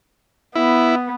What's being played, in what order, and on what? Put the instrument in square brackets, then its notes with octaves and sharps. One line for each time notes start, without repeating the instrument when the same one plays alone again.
[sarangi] B3 [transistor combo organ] E4